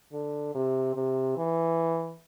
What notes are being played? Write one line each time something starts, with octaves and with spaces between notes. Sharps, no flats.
D3
C3
C3
E3